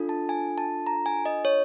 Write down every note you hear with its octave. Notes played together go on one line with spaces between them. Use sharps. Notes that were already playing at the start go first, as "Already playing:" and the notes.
Already playing: D4 F4 A4
A5
G#5
A5
A#5
G#5
D#5
C#5